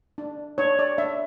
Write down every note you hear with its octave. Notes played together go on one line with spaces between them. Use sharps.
D4
D4 C#5
D5
D4 E5